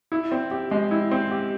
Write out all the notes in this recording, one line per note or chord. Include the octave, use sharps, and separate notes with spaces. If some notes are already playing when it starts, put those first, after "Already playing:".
E4
C4
G4
G#3
E4
C4
G4